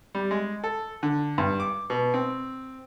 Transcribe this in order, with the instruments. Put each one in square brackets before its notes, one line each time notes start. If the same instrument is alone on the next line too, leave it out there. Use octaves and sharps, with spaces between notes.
[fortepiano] G3
G#3
A4
D3
G2
D6
B2
C4